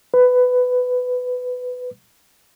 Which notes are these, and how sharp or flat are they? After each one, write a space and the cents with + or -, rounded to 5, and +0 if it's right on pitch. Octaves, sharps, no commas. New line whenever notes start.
B4 +15